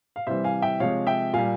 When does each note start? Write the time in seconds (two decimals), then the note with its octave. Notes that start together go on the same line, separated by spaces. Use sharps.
0.16 F5
0.27 C3 E3 G3 C5 E5
0.44 F5 G#5
0.62 E5 G5
0.80 C3 F3 G#3 C#5 F5
1.07 E5 G5
1.33 A#2 G3 F5 G#5